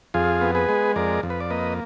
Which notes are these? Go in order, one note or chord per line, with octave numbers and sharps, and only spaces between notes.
F2 F4 G#4
B3
G#4 B4
G#3
F2 A#4 D5
F2
B4
D5
A#3 B4 D#5